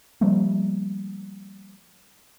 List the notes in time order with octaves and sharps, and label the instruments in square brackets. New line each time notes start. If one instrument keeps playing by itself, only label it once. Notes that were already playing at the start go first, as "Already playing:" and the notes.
[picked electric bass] F3 G3 A3 A#3